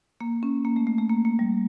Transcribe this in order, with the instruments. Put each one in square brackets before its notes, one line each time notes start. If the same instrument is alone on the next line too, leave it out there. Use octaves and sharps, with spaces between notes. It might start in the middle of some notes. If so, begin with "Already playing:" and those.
[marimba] A#3
C#4
A#3
A3
A3
A3
A#3
A#3
G3